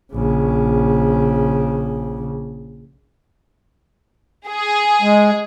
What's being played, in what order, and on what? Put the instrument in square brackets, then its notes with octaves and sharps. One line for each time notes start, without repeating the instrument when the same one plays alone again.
[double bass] A#1 C#3
[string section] G#4
[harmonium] G#3